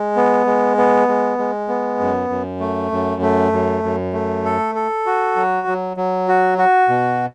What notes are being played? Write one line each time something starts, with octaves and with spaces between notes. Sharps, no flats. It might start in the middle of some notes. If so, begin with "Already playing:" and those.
Already playing: G#3
B3
G#3
B3
G#3
G#3
B3
F#2
F#2
A3
F#2
A3
F#2
F#2
A3
A4
A4
F#4
F#3
F#3
F#3
F#4
F#4
B2